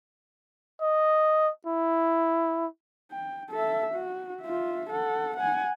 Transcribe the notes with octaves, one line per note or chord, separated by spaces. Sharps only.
D#5
E4
G5
A4 E5
F#4
F4 E5
A4 F#5
F#5 G#5